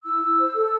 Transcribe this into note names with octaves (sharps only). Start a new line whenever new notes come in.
E4 E6
E4
C5
A4